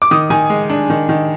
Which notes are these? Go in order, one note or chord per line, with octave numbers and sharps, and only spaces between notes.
D6
D#3 D#6
D#3 G#5
G#3
D4
D#3
D#3